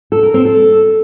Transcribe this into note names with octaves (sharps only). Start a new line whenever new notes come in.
A4
A#4
C4
A4